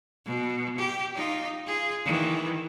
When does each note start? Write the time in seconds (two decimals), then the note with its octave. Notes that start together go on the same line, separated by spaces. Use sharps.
0.26 B2
0.78 G4
1.15 D#4 F4
1.66 F4 G#4
2.05 D#3 E3